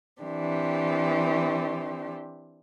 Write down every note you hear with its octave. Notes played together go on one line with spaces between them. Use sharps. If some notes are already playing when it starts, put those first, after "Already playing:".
E3 C4 D4 G4